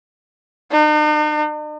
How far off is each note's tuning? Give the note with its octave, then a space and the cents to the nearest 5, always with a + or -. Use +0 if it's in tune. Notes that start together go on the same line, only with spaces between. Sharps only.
D#4 -45